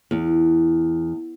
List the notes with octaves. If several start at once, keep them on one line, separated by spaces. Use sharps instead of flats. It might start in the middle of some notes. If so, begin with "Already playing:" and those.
E2